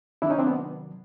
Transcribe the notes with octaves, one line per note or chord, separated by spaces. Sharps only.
C3 D#3 F#3 D4 E4
C#4 D#4
C4 D4
B3